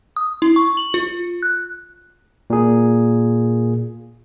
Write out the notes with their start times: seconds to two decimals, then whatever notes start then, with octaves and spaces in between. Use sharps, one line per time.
0.16 D#6
0.42 E4
0.56 C#6
0.77 F#7
0.94 F4
1.43 F#6
2.50 A#2 G#4